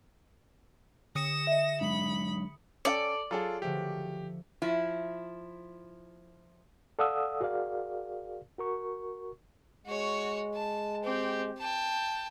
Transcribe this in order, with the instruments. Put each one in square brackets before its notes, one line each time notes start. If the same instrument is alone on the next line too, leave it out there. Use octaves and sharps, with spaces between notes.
[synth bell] D3 D#6 C#7 [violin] A#6 E7
[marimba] D#5 E5
[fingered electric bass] F#3 G#3 D4 [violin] B5
[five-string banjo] C#4 F5 G5 [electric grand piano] A4 C#7 [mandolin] D5
[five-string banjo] F#3 G#4 [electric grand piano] F4 A4
[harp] D3 F3 A3 [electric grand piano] G4
[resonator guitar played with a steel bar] F3 E4
[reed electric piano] A4 D5 F5 F#5 D#6 E6
F#4 G#4 A#4 D5 F5
F#4 A#4 C#6
[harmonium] G#3 [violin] F#4 C#5
[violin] A5
C4 G4
G5 A5